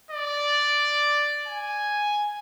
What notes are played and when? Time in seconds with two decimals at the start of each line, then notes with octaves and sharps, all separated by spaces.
0.11 D5
1.47 G#5